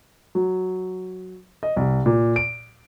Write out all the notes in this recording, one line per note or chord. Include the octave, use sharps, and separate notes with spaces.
F#3
D#5
C2
A#2
D7